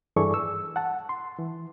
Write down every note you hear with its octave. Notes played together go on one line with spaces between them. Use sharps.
G2 E3 G#4 A4 D5 C#6
E6
F#5 A5
C6
E3